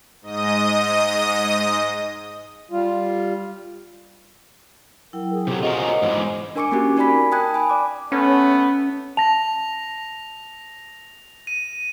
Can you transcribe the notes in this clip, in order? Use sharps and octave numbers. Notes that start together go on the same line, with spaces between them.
G#2 D#5 D#6
G3 F4
F#3 E4 A#4 G5
G#4
C3 F#3 C4 G4 A4
F4 F#4 A#4 C5 C#5 D#5 G#5
G#2 E3 G#3 C5 G#5 D6
D4 A#4 G#5 C#6 D6 C#7
A#3 C4 C#4 F#4 G4
D#4 A#4 D5 G#5 B5 B6
G5 A5 D#6 F#6 G#6
G#5 B5
D5 D6
A3 B3 C#4
A5 A#6 F7
D#7